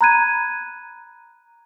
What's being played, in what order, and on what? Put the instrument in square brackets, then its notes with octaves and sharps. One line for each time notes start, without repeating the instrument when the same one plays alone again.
[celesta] A#5 B5 F#6 G#6 D#7